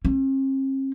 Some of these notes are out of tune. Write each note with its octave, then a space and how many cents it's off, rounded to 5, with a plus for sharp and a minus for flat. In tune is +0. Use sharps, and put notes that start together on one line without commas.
C4 +45